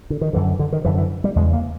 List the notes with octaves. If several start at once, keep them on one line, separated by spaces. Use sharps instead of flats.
D3
D#3
F#2 D3 E3
D3
D#3
F#2 D3 E3
E3
G3
E2 C#3 G#3
A#3